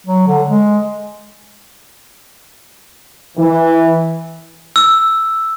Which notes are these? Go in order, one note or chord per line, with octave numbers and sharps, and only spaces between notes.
F#3
D3
G#3
E3
E6